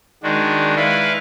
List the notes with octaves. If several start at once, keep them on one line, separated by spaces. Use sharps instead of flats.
D#3 G#3 D4 F#4
E4 B4 F5